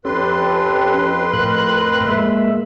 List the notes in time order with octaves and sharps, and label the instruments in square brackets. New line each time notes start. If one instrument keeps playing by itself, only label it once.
[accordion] F2 B4 C6 [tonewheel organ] C#4 G4 A4
[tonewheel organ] A2 A#4 F#6
G#3 A#3 E5